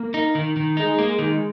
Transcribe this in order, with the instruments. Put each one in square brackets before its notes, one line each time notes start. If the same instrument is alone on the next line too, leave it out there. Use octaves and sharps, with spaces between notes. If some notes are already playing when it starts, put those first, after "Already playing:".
Already playing: [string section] A#3
[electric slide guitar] D#4
D#3
D#3
[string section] G#3 [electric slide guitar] D#4
[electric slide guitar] A#3
D#3